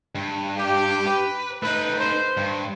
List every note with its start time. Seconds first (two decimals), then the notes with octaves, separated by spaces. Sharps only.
0.15 G2
0.59 G4
1.07 B4
1.63 A3 D#4 B4
2.00 B4 C5
2.37 G2